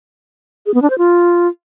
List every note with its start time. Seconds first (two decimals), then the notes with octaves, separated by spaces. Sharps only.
0.66 G#4
0.74 B3
0.82 D4
0.90 C5
0.98 F4